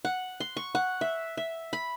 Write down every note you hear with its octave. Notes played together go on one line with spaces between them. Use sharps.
F#5
C6
C#6
F#5
E5
E5
B5